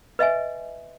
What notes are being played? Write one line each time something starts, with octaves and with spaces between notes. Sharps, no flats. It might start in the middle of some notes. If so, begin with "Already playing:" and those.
B4 D#5 E5 G#5